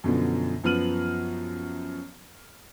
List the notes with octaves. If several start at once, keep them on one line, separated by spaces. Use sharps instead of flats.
F#2 B2 D3 F3
F#2 F3 B3 F6 D#7 F#7